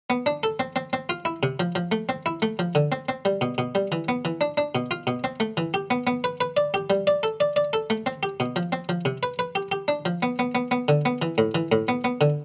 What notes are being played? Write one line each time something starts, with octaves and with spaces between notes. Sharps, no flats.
B3
D4
A4
C4
C4
C4
F4
E4
C3
F3
F3
A3
C4
E4
A3
F3
D3
C4
C4
G3
B2
B2
G3
E3
B3
E3
D4
D4
B2
F4
B2
C4
A3
E3
G4
B3
B3
B4
B4
D5
G4
G3
D5
A4
D5
D5
A4
A3
C4
G4
B2
F3
C4
F3
C3
B4
B4
G4
G4
D4
F3
B3
B3
B3
B3
D3
B3
E3
A2
E3
A2
B3
B3
D3